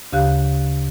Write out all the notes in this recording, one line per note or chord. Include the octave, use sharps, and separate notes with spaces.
D2 C#3 G4 F5 F#6